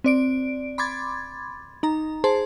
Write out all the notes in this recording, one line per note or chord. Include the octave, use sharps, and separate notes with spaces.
C4 D5 D7
B5 C6 D6 G#6 A6
D#4 A#5
G#4 C5 A5 C6